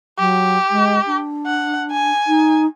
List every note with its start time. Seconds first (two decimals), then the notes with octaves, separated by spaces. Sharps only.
0.19 F#3 G4
0.70 G#3
1.06 D4
1.46 F#5
1.91 G#5
2.26 D#4